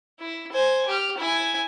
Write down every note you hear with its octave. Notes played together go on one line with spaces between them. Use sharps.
E4
C5 G#5
G4 F6
E4 G#5